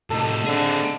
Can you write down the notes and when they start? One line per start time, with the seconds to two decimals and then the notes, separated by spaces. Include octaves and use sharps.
0.10 A2 C3 D#4 A4
0.46 D3 C4 G#4